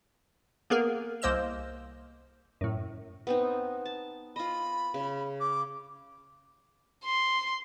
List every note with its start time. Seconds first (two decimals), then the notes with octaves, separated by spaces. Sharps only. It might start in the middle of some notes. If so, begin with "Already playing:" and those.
0.70 A#3 B3 G#4 A#4
1.22 C2 A#3 C5 D#5 E6 E7
2.61 F#2 A2
3.27 B3 C4 D#4
3.86 A5
4.36 F4 D#5 B5
4.94 C#3
5.40 D6
7.05 C6